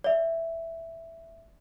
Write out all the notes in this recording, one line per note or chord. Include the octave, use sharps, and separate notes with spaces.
D5 E5